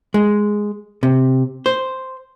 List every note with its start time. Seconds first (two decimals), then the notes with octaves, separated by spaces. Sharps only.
0.14 G#3
1.03 C3
1.66 C5